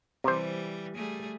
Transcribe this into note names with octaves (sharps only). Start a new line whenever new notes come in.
C3 E3 G3 C5
G3 A3 G#4